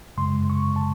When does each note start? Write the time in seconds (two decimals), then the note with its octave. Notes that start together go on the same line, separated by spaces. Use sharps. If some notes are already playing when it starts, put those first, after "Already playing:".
0.17 F#2 C#3 G#3 C6
0.50 C#6
0.76 A5